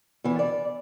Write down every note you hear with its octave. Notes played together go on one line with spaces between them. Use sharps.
E2 E3
D5